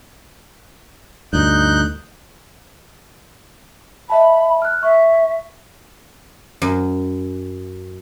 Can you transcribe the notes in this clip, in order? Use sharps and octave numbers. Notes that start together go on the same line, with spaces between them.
D2 G2 D#4 F#6 G6
D#5 E5 A5 B5
F6 F#6
E5 C#6
F#2